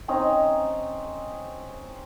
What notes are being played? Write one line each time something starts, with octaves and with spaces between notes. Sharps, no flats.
C4 C#4 D#4 A#5